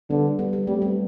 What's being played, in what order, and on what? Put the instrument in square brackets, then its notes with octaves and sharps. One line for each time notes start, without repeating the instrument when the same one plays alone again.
[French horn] D3 [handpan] G3 B3
[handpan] G3 B3
G3 B3
[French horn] G3 [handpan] A3 C4
[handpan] G3 B3